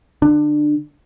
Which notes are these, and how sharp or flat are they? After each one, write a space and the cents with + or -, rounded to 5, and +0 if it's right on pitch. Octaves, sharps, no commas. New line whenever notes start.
D3 +15 D4 +25